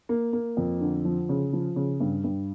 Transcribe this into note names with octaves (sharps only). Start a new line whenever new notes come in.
A#3
A#3
F2
D3
F3
C#3
F3
C#3
G2
G2